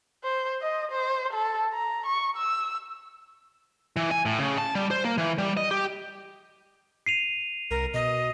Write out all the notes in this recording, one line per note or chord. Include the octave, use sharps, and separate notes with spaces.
C5
D#5
C5
A4
A#5
C#6
E6
E3
G#5
A2
C#3
A5
G3
C5
A#3
E3
G3
D#5
G4
C7 D#7 F7
C2 A#4
B2 D#5